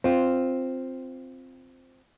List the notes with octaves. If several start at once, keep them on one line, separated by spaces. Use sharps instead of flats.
C4 F4